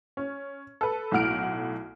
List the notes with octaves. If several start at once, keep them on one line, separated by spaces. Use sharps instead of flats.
C#4
A4 B4
B1 A2 F#5 F6 D7